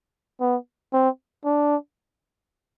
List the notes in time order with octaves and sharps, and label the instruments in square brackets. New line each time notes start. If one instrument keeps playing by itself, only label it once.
[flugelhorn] B3
C4
D4